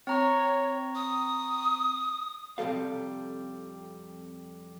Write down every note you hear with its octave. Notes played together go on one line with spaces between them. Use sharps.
C4 C#5 A#5 C#6
D#6
F2 C3 E3 G3 A4 F5